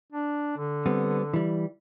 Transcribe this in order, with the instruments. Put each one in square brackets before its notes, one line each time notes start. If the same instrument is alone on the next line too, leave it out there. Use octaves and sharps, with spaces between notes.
[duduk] D4
D3
[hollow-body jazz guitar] G3 B3 C4
E3 G3